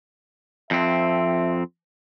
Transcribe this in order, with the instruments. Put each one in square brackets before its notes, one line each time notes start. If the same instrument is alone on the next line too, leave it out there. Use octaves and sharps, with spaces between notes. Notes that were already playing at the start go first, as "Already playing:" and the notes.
[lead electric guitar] F2 C4 [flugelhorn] E5